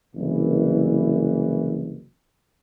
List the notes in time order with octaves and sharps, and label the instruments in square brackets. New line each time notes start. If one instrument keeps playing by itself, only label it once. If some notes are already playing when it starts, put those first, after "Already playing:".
[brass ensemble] F#1 C2 E3